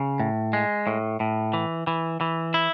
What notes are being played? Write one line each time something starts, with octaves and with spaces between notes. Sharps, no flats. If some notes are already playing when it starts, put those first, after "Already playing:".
Already playing: C#3
A2
G#3
A2
A2
E3
E3
E3
E4